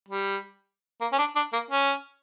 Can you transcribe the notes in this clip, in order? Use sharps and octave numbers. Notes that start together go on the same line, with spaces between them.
G3
A#3
C#4
D4
D4
A#3
C#4